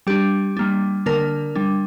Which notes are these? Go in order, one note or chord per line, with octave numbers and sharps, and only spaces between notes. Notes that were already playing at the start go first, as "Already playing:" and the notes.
G3 D4 G4
G3 A#3 D4
D3 A#3 D4 A#4
G3 D4